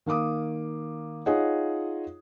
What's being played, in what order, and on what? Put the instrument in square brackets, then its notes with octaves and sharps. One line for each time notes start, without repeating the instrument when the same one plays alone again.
[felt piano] D#3 A#3 F5 D6 D#6
D#4 F4 G#4 C#5 D#5 F#5